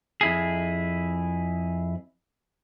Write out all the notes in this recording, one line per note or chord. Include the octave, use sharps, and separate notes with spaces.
F2 E4 G#4